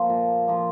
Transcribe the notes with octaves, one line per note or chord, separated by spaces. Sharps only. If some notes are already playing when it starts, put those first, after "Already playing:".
Already playing: F3 A#3 A4 C5
A#2
F3 A#3